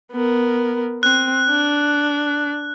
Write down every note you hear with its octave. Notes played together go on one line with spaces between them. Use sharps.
B3 A#4
C4 F#6
D4